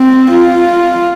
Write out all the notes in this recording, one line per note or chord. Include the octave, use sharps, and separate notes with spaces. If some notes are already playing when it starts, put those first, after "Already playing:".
Already playing: C4
F4